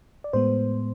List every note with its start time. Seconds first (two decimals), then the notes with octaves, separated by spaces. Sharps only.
0.24 D5
0.33 A2 G#3 B3 C5